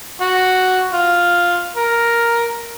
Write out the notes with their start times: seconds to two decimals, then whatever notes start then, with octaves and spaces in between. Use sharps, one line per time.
0.21 F#4
0.93 F4
1.76 A#4